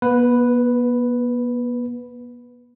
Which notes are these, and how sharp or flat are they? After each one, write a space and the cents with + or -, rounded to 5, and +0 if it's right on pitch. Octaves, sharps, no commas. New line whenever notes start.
B3 -40 B4 +0